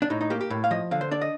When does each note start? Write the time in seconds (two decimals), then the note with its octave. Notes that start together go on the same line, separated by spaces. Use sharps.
0.02 D4
0.10 A2 D#4
0.21 D#4
0.30 A#3 G4
0.41 G4
0.50 A2
0.64 F5
0.71 F3 D#5
0.91 D3 F5
1.01 C5
1.11 D4 D5
1.21 D#5